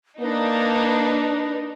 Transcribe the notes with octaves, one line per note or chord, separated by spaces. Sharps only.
A#3 D4 D#4 B4